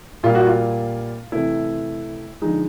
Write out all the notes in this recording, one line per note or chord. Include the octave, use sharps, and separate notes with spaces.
A#2 G3 F4
F#4
F4
C3 E3 A3 E4
D3 F3 G#3 D#4